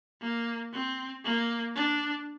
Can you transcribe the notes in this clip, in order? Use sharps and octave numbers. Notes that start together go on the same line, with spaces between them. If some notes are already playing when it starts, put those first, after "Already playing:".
A#3
C4
A#3
D4